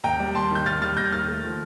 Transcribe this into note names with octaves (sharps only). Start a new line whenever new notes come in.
D#2 G5 A#5
G3
D#2 A5 C6
D#3 G6
D#2 F6 A6
G3 F6 A6
D#2 G6 A#6
D#3 F6 A6
A3
F3